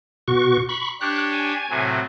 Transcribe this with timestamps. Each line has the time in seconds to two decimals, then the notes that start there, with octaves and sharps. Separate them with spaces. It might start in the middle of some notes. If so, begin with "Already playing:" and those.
0.28 B2 F#4 C#6
0.69 B5 C#6
1.01 D4 G4 C#5 F#6
1.33 G#5
1.70 A2 C3 F#3